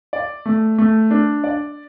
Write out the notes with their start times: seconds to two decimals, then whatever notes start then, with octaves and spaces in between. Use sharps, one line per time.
0.13 D5
0.46 A3
0.78 A3
1.11 D4
1.44 D5